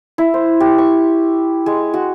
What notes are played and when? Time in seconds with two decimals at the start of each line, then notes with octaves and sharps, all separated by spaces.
0.18 E4
0.34 C5
0.60 G4
0.78 C#6
1.66 G#3
1.94 F#4